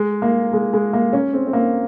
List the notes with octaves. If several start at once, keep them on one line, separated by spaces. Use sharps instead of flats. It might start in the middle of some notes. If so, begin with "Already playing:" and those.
Already playing: G#3
A#3
G#3
G#3
A#3
C#4
C4
C4
A#3